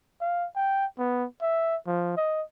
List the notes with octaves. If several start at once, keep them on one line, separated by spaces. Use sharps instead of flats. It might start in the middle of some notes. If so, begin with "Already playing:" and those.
F5
G5
B3
E5
F3
D#5